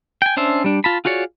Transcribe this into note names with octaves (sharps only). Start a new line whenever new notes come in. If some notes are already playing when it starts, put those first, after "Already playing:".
G5 G#5
C#4 D4 C5 E5
G3 D4
F4 A5 B5
F4 F#4 G#4 C#5 D5